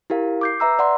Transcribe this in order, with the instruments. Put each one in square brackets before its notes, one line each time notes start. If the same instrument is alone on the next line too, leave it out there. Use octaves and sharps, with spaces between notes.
[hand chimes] E4 G4 A#4 F5
D6 G6 C7
B4 E5 A#5 E6
D5 F#5 C6